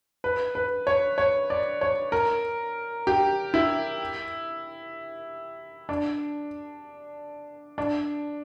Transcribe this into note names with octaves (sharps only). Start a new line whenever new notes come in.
B4
B4
C#5
C#5
D5
C#5
A#4
G4
E4
D4
D4